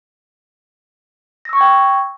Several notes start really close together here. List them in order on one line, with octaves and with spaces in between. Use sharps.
A#6 E6 C#6 G#6 G5